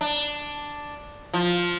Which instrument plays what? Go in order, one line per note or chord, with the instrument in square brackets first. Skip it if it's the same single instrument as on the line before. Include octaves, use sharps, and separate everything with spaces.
[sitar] D4
F3